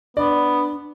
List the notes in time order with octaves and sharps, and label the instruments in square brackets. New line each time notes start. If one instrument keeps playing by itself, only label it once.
[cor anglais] B3 [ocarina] D4 [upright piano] D5